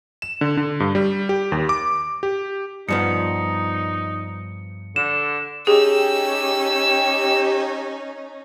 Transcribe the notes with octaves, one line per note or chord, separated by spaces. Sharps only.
E7
D3
D3
G2
G3
G4
D#2
D6
G4
G2 F3 B3 D#4 C#7
D3 E7
C#4 D#4 G4 G#4 E6